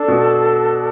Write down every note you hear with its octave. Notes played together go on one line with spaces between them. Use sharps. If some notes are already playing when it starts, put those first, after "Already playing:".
Already playing: D4 A4
B2